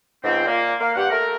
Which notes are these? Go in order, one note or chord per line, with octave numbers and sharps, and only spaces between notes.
C#2 G#2 C4
A#2 A#3
A#3 F5
G2 G4 F#5
A3 A#4